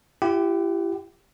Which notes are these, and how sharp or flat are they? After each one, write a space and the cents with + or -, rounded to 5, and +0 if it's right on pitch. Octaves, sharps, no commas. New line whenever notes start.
E4 +40 G4 +0 F#5 +35